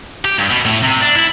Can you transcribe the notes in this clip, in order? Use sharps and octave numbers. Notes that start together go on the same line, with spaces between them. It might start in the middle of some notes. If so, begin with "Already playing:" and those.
G4
G2
B2
A2
C3
D4
E4